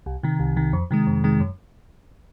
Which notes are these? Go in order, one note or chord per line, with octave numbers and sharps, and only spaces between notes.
C2
C3 D#3
C2
C3 D#3
F2
C3 D#3 G#3
F2
C3 D#3 G#3
F#2